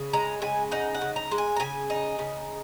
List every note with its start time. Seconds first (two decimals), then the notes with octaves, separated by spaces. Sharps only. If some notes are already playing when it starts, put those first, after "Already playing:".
Already playing: C#3
0.13 G#3 A#5
0.42 C#3 G#5
0.71 D#4 F#5
0.94 F#5
1.01 C#3
1.16 A#5
1.31 G#3
1.38 G#5
1.56 A#5
1.60 C#3 G#5
1.90 D#4
2.19 C#3